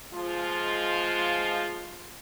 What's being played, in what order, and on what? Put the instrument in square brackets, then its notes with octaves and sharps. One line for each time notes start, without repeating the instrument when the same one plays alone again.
[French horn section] F3 G#3 F4